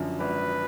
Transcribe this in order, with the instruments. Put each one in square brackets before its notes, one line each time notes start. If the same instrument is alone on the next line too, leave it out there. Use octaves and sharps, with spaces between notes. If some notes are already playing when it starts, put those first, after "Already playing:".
Already playing: [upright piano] G#1 F#2 D3 F3
[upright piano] G#1 [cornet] B4